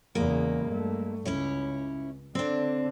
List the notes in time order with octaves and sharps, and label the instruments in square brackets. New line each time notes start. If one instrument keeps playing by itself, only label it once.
[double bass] E2 C#3 [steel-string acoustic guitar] G#3 A#3
[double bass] G2 A3
[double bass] C#2 [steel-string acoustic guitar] C#4 E4 C#5
[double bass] D3 [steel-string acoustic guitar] C4 D4